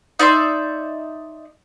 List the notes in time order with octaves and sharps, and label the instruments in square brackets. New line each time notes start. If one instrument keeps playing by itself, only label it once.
[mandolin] D#4 D5 E5 C6